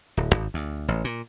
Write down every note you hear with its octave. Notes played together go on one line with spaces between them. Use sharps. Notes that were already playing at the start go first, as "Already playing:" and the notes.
D1
G#1
D2
A1
A#2